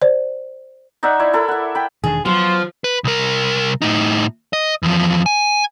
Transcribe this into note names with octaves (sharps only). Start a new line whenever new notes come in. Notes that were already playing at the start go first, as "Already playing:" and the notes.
C5 D5
D#4 D5 E5 F#5
E4 C#5 D5
E4 A4 A#4 B5
E5 F#5
G5 B5
E1 D#3 D4 G#4
F3 F#3 B3 C6
B4
C2 A#4
A2 D#4
D#5
E2 F3
G#5